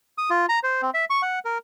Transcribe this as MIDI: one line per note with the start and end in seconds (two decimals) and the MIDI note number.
0.18 0.30 87
0.30 0.46 65
0.49 0.59 82
0.63 0.82 72
0.82 0.90 60
0.94 1.05 76
1.10 1.22 85
1.22 1.39 78
1.45 1.58 70